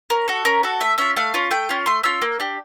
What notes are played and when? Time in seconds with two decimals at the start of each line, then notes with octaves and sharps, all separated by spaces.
0.10 C#4 A#4
0.28 F#4 A4
0.45 C#4 A#4
0.63 F#4 A4
0.80 A3 E5
0.98 C#4 F4 E5
1.16 A3 F5
1.34 C#4 F4
1.51 A3 G5
1.69 C#4 F4
1.86 A3 C6
2.03 C#4 F4 E6
2.22 A#3
2.40 D4 G4